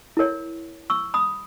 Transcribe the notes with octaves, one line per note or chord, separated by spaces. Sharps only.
E4 A#4 C#5
C#6 E6
B5 D#6